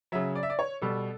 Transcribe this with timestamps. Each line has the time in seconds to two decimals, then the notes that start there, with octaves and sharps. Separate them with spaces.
0.12 C#3 F#3 E5
0.35 D5
0.43 E5
0.50 D5
0.59 C#5
0.82 B2 G3 A4